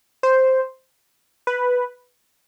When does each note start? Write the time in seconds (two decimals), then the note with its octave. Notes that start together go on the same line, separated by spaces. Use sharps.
0.23 C5
1.47 B4